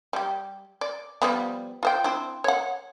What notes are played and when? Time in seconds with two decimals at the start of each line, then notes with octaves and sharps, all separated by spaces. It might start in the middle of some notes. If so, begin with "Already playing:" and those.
0.13 G3 G4
0.81 D5
1.22 F3 G3 B3
1.83 F4 C5 G5
2.04 C4 D4 E4
2.44 C#5 F#5